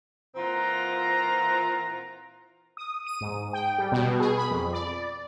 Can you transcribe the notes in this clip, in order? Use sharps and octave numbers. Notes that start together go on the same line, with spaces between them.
A#2 E3 C4 F4 F#5 A#5
D#6
D#7
G#2
G5
G3
B2
G#4
B5
F2
D5